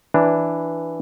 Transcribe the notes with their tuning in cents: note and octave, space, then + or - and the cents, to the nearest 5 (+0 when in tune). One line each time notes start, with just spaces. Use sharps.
E3 +0 D4 +0 B4 +0